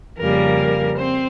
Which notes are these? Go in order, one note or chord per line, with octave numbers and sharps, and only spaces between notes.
F2 C#3 G3 A#3 A#4
C4 C5